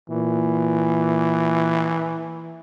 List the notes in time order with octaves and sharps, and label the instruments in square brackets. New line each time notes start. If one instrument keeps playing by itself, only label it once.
[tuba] A#2 [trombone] E3